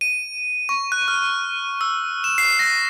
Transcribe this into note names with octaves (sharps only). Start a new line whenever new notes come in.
D#7
C#6
F#6
F6
E6
E7
C7
A#6